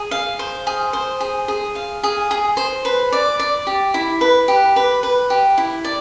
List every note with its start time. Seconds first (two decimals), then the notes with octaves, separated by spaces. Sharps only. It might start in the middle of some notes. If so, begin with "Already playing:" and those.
Already playing: G#4
0.11 F5
0.39 C5
0.67 G#4
0.93 C5
1.20 G#4
1.48 G#4
1.75 F5
2.03 G#4
2.31 G#4
2.57 C5
2.85 B4
3.12 D5
3.39 D5
3.67 G4
3.94 E4
4.21 B4
4.48 G4
4.76 B4
5.03 B4
5.30 G4
5.58 E4
5.84 D5